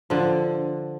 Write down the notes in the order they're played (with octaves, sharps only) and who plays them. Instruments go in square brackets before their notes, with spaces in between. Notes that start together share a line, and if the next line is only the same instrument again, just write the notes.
[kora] D3 F3